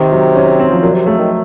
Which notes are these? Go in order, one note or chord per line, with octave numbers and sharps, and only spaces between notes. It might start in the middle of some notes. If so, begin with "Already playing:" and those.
Already playing: C3 D#3
F#3
C#4
C4
F3
A#2 F#3
C3
C#3 A3
D#3